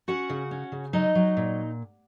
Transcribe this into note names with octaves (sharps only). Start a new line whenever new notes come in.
C#4 F#4 F#5
C#3
C#4
C#3
F#3 D#4 D#5
F#3
A#2